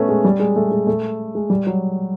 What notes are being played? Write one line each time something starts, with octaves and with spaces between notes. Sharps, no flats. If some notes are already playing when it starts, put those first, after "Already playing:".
Already playing: A3 B3 C#4
G#3
G3
G#3
A3
G#3
A3
G#3
G3
F#3